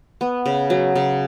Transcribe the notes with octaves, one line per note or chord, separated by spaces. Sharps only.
B3
C#3
F#3
C#3